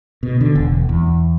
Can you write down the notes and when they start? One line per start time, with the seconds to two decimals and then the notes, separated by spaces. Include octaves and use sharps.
0.23 B2
0.41 D3
0.55 E1
0.89 E2